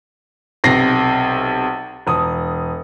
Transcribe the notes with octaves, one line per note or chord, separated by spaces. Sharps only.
B1 C3 A#6 C7
E1 D#6